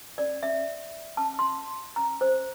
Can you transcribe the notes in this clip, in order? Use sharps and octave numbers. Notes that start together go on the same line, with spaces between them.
D5
E5
A5
C6
A#5
C5